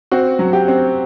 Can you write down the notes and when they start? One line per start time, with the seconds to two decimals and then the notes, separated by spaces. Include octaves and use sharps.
0.12 C4 F#4
0.39 F#3
0.53 G4
0.68 C4